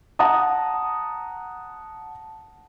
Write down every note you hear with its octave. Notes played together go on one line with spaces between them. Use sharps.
F#5 A5 A#5 D#6